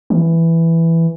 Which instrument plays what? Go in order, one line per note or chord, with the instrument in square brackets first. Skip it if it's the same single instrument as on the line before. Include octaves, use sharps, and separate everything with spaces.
[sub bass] E3